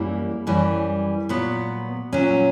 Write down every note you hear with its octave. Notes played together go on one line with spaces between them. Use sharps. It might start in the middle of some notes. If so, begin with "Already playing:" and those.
Already playing: F#2 E3 G3 A#3
F#2 E3 G3
A#2 F#3 B3
A#2 F#3 C#4